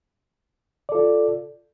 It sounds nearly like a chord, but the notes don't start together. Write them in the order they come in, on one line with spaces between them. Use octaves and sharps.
D5 A4 F4